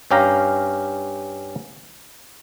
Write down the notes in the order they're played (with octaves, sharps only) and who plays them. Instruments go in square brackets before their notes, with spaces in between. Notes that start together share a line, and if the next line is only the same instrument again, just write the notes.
[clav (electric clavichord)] G2 C#4 G4 F5 A#5